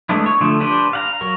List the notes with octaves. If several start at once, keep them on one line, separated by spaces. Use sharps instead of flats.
G#3 A3 B3 D4 E4
C#5
D3 F3 A3
D4 G4 B4 C5 D5
F5 F#5 A#5
F#3 F#4 A#4